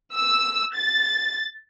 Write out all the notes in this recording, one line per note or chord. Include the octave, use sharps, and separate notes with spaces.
E6
A6